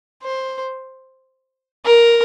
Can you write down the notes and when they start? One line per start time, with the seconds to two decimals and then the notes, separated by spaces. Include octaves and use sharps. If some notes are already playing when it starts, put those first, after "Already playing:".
0.23 C5
1.86 A#4